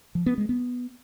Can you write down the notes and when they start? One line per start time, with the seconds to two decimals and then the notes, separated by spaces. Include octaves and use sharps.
0.15 F3
0.26 B3
0.38 G#3
0.49 B3